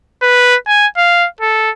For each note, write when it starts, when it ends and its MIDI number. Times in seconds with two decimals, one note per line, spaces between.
0.22 0.56 71
0.67 0.87 80
0.97 1.27 77
1.40 1.70 69